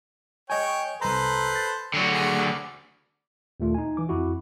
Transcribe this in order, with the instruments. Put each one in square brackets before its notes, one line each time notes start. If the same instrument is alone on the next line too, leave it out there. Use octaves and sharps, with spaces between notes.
[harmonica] C#5 G5 [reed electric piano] D#5 G#5
[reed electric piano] C2 A#5 [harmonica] A4 B4 C5
[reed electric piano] A6
[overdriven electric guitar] D3 F#3
[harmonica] G#4
[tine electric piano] D#2 A#2 A3 F4
D#4 G#5
E3 D6
F2 E4 F#4